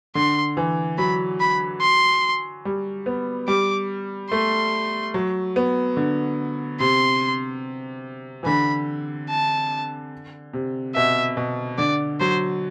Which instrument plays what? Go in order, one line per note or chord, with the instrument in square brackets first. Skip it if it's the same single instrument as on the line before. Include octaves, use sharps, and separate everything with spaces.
[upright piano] D3 [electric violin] C6
[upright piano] E3
[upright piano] F#3 [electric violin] B5
[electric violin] B5
C6
[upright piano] G3
B3
[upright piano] G3 [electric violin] D6
[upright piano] A3 [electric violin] C6
[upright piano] F#3
B3
D3
[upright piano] C3 [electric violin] C6
[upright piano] E3
[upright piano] D3 [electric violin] B5
[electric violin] A5
[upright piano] C3
[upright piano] B2 [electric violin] E5
[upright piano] B2
[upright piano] D3 [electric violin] D5
[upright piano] F#3 [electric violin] C5